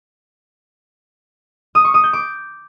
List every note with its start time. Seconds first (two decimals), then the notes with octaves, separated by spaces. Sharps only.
1.75 D#6
1.85 C#6
1.94 D#6
2.04 G6
2.13 D6